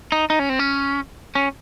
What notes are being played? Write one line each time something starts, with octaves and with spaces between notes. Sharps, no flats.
D#4
D#4
C#4
C4
C#4
C#4